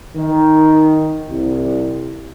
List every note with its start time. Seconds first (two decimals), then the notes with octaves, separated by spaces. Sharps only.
0.16 D#3
1.29 C2